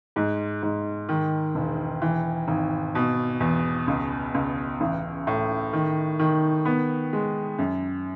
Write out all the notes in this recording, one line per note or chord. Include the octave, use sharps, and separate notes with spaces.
G#2
G#2
D#3
E1
E3
G#1
B2
E2
C#2
C#2
A1
A2
D#3
D#3
B3
G#3
F#2